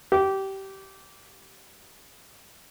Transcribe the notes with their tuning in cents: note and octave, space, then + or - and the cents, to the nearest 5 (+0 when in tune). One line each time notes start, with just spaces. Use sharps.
G4 -20